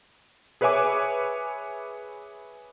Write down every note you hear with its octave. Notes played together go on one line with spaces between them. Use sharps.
G#4 B4 C#5 E5 G#5 D6